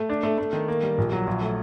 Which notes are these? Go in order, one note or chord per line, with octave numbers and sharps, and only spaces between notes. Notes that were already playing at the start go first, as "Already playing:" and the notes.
Already playing: A3
D4
A3
A3
D#3
A#3
G3
A#1
F#3
A#1
A3